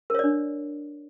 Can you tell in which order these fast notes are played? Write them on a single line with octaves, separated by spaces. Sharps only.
A#4 C#5 D5 D4